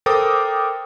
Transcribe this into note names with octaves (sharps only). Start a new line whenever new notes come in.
A4 A#4 C5 G5 D6 D#6